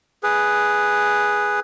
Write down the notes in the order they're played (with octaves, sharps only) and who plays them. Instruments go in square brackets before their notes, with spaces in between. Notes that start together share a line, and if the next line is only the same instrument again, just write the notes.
[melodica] G#4 B4